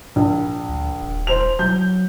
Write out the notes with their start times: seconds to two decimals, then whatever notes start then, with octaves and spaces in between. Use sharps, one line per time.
0.16 A#1
0.69 D2
1.02 D#1
1.27 C5 F7
1.59 F#3 G6